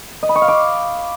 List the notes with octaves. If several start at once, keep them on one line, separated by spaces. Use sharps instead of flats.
D#5
B5
C#6
F5
D6